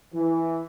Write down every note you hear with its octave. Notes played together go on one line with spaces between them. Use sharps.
E3